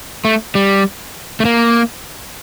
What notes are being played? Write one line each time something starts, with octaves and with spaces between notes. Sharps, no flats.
A3
G3
A3
A#3